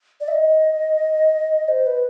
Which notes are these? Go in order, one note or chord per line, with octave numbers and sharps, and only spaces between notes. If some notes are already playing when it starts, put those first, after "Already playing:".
D5
E5
D#5
C5
B4